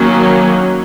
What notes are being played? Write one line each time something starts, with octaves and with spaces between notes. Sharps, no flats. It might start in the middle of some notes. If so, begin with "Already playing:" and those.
Already playing: D#3 F#3 A#3 C#4